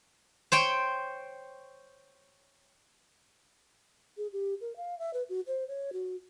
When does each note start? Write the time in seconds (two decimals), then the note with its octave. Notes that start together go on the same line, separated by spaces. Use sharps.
0.52 C5 C#5 G5
4.18 G#4
4.33 G4
4.61 A#4
4.77 F5
4.99 E5
5.14 B4
5.29 F#4
5.47 C5
5.68 C#5
5.93 F#4